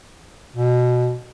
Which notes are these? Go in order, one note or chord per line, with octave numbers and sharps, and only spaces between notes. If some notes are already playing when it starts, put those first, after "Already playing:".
B2